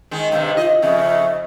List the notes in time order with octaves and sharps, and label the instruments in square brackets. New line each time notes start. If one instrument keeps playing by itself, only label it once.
[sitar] D#3 G#3
[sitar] G2 C3 D#3 [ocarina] F5
[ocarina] F4 [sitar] D#5
[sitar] F2 C#3 [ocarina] E5